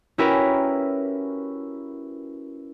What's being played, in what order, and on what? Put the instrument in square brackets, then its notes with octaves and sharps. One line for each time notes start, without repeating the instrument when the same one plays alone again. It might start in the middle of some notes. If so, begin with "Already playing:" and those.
[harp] C#4 E4 F#4 G4 A#4 B4